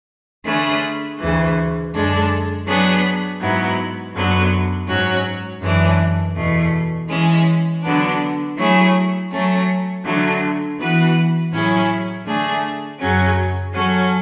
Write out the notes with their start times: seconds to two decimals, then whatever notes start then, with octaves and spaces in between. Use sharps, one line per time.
0.45 D3 A3 C#4 G#4 B4
1.19 D2 C#3 E3
1.93 F#2 D3 G#3 D4 A4
2.67 F#3 B3 D4 G#4 B4
3.40 G#2 F#3 B3 E4
4.14 F#2 D3 F#3 B3
4.88 G#2 F#3 C#4 F#4
5.61 F#2 E3 G#3 D4
6.36 E2 B2 A3
7.09 E3 G#3 C#4
7.83 D3 F#3 B3 D4
8.57 F#3 A3 E4 G#4
9.31 F#3 A3 C#4
10.04 D3 F#3 A3
10.79 E3 B3 F#4 B4
11.52 A2 F#3 C#4 E4 G#4
12.25 D3 A3 D4 G#4
13.00 F#2 C#3 F#3 C#4
13.73 F#3 C#4 F#4 A4